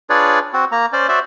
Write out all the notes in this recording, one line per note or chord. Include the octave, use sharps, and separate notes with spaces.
D4 F4 G#4 B4 C#5 D5
C4 F#4
A#3 A#5
C#4 C5 D5
F#4 C5 D5 E5